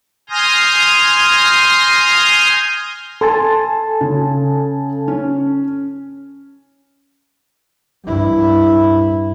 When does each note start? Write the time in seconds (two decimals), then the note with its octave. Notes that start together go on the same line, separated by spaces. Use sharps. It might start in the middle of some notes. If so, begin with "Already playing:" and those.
0.30 G#5 C6 D#6 F6 G6 A#6
3.21 A4 G#5 A5 C6
4.01 C#3
5.08 C#4
8.05 G2 E4